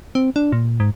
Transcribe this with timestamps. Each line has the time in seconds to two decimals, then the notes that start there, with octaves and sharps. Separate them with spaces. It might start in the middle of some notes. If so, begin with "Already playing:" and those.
0.15 C4
0.36 D4
0.52 A#2
0.80 G#2